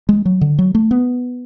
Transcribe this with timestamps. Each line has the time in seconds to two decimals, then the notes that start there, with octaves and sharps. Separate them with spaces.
0.09 G#3
0.25 F#3
0.41 D3
0.59 F#3
0.75 A3
0.91 B3